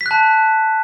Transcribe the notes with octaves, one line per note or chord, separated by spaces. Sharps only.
B6
F#6
A5